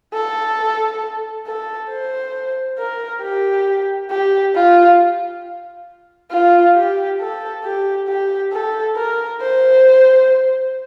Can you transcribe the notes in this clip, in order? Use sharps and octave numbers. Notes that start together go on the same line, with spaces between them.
A4
A4
C5
A#4
G4
G4
F4
F4
G4
A4
G4
G4
A4
A#4
C5